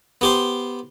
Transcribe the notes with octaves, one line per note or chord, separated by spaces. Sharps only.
B3 G4 C5